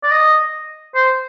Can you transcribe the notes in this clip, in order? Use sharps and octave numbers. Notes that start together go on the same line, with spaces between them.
D5
D#5
C5